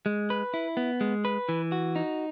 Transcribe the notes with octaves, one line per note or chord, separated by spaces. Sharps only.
G#3
B4
E4
B3
G#3
B4
E3
F#4
D#4